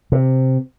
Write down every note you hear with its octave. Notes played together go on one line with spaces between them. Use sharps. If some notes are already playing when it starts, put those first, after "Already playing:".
C3